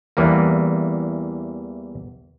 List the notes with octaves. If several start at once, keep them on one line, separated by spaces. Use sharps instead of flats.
E2 E3 G3 A#3